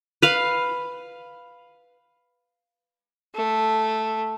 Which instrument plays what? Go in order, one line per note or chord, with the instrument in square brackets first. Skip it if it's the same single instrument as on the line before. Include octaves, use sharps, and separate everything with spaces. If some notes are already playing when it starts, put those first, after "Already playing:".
[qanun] B4 F5
[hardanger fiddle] A3